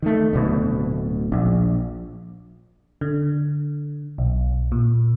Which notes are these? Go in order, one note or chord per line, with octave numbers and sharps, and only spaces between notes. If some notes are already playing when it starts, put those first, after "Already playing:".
D#3 A3
D1 D2 B2
A#1
D3
B1
A#2